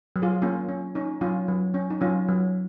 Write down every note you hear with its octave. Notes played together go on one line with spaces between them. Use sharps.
F#3
F4 G#4
A#3 C#4 F4
C#4
C#4 D#4
F#3 C#4 F4
F#3
C#4
D#4
F#3 C#4 F4
F#3